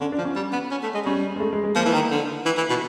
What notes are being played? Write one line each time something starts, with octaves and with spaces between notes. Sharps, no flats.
D3 C#4
D4
F3
C#4
G3
B3
C#4
A3
G#3
G3 C#4
G#3
A3
G#3
G#3
F3 A#3
E3
D#3
D3
E3
E3
B2